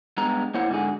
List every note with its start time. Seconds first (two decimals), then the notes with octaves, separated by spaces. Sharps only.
0.17 G2 G#3 B3 A#5
0.54 A#3 E4 C5 C#5 F#5
0.69 G#2 D3 F#4 G#4